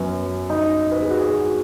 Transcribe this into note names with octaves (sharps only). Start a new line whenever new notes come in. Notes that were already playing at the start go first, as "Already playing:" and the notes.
Already playing: F#2 F#3 B3 C#4
D#4 D#5
B4
G#4
F#4
G#4
F#4